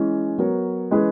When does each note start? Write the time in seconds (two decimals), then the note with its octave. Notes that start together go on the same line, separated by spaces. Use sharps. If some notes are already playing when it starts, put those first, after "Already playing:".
Already playing: E3 G#3 C#4
0.38 F#3 B3 F#4 A#4 C#5
0.91 E3 G#3 C#4 G#4 B4